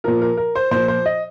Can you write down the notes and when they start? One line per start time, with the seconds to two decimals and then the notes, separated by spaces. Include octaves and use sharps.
0.04 A#2 F3 A#4
0.21 A#4
0.37 A#4
0.55 C5
0.71 A#2 F3 C5
0.88 C5
1.06 D#5